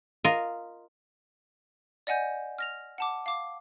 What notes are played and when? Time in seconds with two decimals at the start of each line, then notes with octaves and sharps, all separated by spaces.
0.25 F4 A#4 D#5
2.07 D5 D#5 F#5 G#5 G6
2.59 F6 A#6 F7
2.98 F#5 A5 D6
3.26 F5 D6